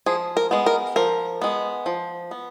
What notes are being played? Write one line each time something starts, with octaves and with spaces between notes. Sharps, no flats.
F3 G#4
A#4
G#3 B3
A#4
F3 A#4
G#3 B3
F3
B3